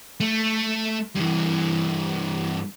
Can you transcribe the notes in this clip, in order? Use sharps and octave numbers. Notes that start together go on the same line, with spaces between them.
A3
G2 E3